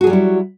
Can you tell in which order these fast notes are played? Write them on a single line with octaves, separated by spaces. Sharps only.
F#4 G#4 F#3 G3 E4